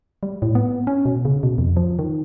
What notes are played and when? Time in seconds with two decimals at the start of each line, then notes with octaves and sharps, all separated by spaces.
0.23 G3
0.42 A2
0.55 B3
0.87 C#4
1.05 B2
1.25 C#3
1.43 B2
1.58 F2
1.77 F3
1.99 D#3